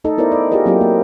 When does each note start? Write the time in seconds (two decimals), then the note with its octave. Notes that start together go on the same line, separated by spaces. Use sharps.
0.04 A3 D#4 A4 D#5
0.18 B3 E4 A#4 C5 D5 D#5
0.32 A4 D5
0.51 F4 G4 G#4 A#4 D#5
0.66 F#3 A#3 C4 E4 F4 G4
0.81 A#3